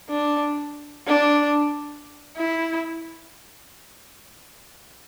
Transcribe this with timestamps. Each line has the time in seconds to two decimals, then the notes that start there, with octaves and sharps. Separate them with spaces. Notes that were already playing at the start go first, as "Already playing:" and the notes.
0.10 D4
1.07 D4
2.37 E4